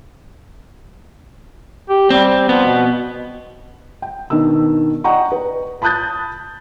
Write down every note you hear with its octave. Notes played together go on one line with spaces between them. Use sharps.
G4
G3 C4
F3 B3
B2
G5
B2 D#3 D4 E6
D5 D#5 F#5 G5 A#5 C#6
B4
A5 B5 D#6 F#6 G6 A6